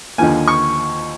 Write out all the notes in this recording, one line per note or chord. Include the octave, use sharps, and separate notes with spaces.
D#2 D3 F3 A#3 G#5
C#6